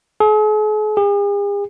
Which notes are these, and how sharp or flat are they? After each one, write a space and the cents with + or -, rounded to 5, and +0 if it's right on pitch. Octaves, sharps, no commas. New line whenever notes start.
G#4 +45
G#4 -45